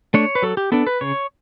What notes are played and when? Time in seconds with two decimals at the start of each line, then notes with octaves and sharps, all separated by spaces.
0.14 A3 D4 C#5
0.35 B4
0.42 F#3 A4
0.57 G4
0.72 B3 D4 A4
0.87 B4
1.01 C#3 C#5